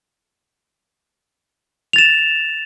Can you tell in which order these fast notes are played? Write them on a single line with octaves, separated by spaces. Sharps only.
F7 A6 E7